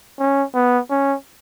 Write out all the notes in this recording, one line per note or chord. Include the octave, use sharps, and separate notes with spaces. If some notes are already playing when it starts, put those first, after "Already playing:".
C#4
B3
C#4